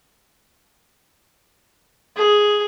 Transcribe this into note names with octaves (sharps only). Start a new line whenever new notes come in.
G#4